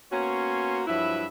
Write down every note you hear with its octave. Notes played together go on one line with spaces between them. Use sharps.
A#3 B3 C#4 F#4 C#5 C6
G2 F3 F#3 E4 B4 E5